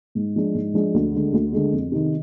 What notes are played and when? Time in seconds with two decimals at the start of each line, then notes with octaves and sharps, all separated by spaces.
0.15 G#2
0.36 F3 G#3 D4
0.54 G#2
0.74 F3 G#3 D4
0.94 D2
1.14 D3 G#3
1.33 D2
1.53 D3 G#3
1.73 F2
1.92 C3 D#3